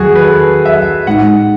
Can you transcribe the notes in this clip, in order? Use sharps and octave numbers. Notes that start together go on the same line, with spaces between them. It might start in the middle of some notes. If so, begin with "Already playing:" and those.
Already playing: E2 D#3 F#3 F#4 G#4
B4
A4
E5
A2 G#3 D#4 F#5